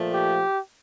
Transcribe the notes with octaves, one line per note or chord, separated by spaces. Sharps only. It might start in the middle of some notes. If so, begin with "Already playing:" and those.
Already playing: A#2 F3 A3
G4